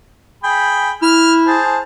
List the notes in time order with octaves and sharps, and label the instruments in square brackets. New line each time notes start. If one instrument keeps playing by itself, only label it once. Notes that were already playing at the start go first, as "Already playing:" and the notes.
[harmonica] G#4 G5 B5
[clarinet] E4 [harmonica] F6
[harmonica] G#4 C5 A5